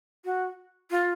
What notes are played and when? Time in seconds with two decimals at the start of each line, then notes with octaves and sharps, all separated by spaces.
0.25 F#4
0.91 F4